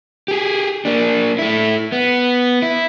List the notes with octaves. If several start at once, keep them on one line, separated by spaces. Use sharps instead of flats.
G4 G#4
A#3 D4
A3 E4
B3
E4